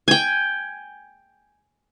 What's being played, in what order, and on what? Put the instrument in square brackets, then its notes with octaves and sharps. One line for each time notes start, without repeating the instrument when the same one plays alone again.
[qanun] G5 G#5